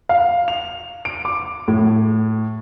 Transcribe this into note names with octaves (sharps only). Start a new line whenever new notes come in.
F5
F7
D7
D6
A2